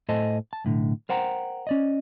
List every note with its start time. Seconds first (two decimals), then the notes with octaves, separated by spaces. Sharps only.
0.09 A2 A4 C5 D#5 G#5 A5
0.53 A5
0.65 B1 A2 D3
1.09 A#4 C5 F#5 G5 A#5
1.67 C#4 D5 D#5